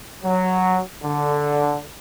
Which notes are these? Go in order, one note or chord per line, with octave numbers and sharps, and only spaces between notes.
F#3
D3